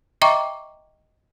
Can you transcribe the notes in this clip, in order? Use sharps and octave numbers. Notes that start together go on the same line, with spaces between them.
D#5 E5 G5 A#5 C#6 D6